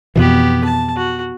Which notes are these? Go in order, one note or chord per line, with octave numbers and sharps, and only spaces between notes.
F2 B2 E3 B3 G4
A5
F#4